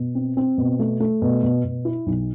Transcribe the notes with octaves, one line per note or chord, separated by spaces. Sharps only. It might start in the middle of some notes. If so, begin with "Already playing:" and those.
Already playing: B2
C4
C4
B2
A3
A3
B2
B2
B2
E4
B1